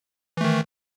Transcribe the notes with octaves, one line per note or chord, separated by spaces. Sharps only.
D#3 E3 A3